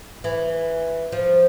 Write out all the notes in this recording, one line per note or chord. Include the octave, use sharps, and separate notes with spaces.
E3
F3